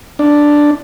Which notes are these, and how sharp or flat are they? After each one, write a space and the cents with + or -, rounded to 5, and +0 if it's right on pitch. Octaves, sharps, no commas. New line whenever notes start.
D4 +0